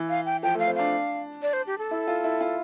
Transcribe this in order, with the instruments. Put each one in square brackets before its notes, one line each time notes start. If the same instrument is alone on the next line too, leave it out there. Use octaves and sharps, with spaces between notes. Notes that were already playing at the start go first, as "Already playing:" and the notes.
Already playing: [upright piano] E3
[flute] F5
G5
[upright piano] F3 [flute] G5
[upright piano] A3
[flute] F5
[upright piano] C4
[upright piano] D4 [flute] F5
[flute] D5
C5
G4
A4
[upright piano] E4
F4
E4
F4